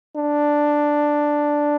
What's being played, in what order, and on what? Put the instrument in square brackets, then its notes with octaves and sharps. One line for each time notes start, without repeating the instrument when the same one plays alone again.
[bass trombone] D4